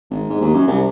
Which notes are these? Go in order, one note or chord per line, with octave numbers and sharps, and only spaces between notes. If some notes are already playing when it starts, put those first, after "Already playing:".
G#1
G#2
D#2
F#2
C2